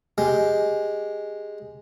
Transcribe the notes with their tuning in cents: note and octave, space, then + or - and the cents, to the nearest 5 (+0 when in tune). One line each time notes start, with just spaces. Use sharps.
G#3 +0 G4 +0